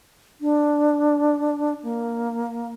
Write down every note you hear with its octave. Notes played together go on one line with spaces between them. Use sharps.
D4
A#3